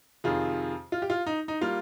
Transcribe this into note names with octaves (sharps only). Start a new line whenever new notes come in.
F2 C3 D#3 F4 G#4
F4
G4
F4
D#4
D#4
G3 A#3 F4